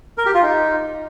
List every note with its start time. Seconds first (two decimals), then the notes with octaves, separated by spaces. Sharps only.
0.18 A#4
0.26 G4
0.34 F4
0.42 D#4